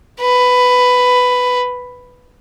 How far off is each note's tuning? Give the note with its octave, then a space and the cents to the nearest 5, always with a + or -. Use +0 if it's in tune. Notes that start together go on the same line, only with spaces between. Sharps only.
B4 +10